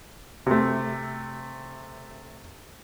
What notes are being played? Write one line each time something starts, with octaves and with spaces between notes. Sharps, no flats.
C3 A3